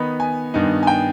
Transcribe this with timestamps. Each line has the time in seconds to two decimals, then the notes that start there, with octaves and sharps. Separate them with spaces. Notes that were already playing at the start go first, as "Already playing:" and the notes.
Already playing: D#3 B3 D#4 B5
0.20 G#5
0.54 G2 D#3 B3 D#4
0.83 G#5
0.87 G5